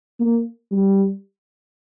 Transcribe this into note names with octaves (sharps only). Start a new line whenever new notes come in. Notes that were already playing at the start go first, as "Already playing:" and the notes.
A#3
G3